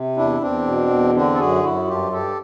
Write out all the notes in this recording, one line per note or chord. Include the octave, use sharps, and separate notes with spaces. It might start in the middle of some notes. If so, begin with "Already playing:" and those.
Already playing: C3
E2 D4 E4
E2 C4 D4
B2
E2
D3 C4 D4
A4
F#2 F#4 G#4
F#2 E4 F#4
G2 F4 G4
G2 G4 A4